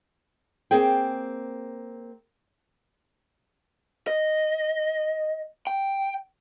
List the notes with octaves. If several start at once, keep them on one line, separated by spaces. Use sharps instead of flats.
A#3 C4 G#4 G5
D#5
G5